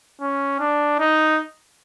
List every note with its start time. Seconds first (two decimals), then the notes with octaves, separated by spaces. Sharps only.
0.21 C#4
0.60 D4
0.99 D#4